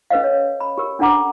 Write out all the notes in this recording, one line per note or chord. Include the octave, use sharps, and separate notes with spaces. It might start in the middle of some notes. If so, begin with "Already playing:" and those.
C#4 A4 B4 C5 D#5 F5
C#5
B5
G4 A#4
C#4 D4 A4 F#5 A#5 D6